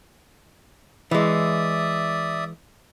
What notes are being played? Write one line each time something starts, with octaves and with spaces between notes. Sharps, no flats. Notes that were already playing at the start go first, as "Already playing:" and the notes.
E3 G#3 D5 E5 D#6